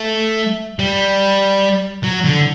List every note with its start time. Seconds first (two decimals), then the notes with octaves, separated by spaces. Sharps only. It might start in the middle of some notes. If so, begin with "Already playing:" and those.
Already playing: A3
0.79 G3
2.04 F#3
2.25 D3